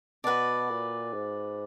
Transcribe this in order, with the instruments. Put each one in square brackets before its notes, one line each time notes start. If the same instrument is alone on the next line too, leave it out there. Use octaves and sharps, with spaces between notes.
[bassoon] B2 [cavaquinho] F#4 B4 D5
[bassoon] A#2
G#2